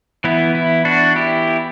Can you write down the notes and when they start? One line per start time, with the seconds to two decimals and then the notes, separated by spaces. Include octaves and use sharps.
0.24 E3 B3 E4
0.55 E4
0.85 D4 F#4
1.16 E4 G4